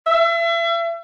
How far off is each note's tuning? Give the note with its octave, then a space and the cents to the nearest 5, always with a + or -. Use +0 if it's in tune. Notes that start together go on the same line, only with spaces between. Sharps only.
E5 +35